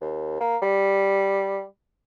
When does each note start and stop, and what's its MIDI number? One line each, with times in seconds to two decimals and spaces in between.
0.01 0.40 39
0.40 0.57 58
0.62 1.62 55